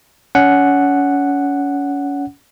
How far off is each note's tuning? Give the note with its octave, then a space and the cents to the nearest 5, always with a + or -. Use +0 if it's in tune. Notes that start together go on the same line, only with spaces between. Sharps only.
C#4 +30 F#5 +0